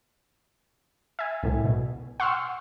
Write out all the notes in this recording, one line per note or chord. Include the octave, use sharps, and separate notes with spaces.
E5 G#5
C2 A2
B2
F#5 C6 C#6 E6 F6